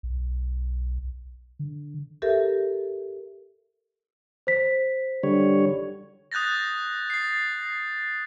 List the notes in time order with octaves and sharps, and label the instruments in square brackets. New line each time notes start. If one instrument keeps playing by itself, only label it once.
[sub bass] B1
D3
[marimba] G4 A4 A#4 E5
[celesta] C5 B6
[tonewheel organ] D3 G3 C#5
[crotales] D#6 F#6 G6 A6 A#6
A6 C7